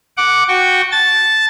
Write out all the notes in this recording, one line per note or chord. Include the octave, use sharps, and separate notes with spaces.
F#5 D6
F#4 G5 C#6
A5 A6